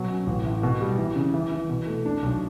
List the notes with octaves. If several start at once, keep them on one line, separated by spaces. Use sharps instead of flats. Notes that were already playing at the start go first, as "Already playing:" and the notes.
Already playing: B2 F#3
C#4
A1
A2
B2
G3
E3
C#3
E3
E3
B2
A3
D4
B1